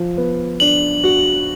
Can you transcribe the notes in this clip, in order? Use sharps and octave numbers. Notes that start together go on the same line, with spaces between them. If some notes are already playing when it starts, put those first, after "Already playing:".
Already playing: F3
B3
D4 F#7
F#4